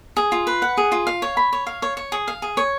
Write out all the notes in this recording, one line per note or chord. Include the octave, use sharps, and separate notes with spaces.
G#4
F4
B4
F#5
G#4
F4
F5
C#5
B5
C#5
F5
C#5
C#5
G#4
F5
G#4
C#5